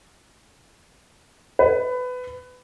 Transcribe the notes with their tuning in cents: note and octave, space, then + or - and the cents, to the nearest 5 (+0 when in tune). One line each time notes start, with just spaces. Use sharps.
B4 +20